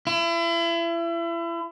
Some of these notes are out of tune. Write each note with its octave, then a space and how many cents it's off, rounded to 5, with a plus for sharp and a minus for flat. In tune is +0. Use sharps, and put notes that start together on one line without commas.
E4 +35